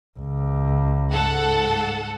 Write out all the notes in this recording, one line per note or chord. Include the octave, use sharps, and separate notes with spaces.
C#2
G#2 A4 F#5